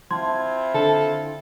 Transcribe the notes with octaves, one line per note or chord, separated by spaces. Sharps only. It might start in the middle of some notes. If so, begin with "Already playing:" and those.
C4 E4 F4 A5 C6 G#6
D3 A4